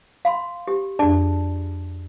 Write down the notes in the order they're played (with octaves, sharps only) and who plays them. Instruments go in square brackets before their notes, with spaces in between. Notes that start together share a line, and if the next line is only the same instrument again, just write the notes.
[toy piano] F5 B5 C6
G4
[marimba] F2 D4 [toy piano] G#4 D5 A5